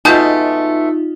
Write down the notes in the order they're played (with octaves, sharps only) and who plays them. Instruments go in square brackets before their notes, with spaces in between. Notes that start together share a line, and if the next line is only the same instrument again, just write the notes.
[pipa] B2 G#3 A3 [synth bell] D#4 F4 [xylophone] A5 D#6 G6